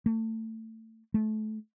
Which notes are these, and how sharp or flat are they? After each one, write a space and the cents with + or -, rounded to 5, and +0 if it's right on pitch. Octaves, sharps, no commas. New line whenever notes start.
A3 +25
A3 -25